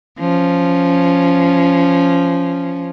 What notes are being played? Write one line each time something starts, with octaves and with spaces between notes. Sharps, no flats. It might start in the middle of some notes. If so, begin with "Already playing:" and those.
F3 C#4